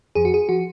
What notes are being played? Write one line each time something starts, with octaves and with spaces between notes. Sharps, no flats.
F2 F3 G#4
F#4
G#4
F3 F#4